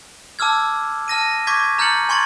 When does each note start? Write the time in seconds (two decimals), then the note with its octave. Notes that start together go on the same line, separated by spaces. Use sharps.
0.39 A5 D6 E6 F6 G#6
1.08 A5 F6 A#6 D#7
1.47 C#6 D6 G6 G#6 B6
1.78 A#5 F6 G6 A6 C#7 F#7
2.09 G#5 C6 C#6 G#6 A6 F#7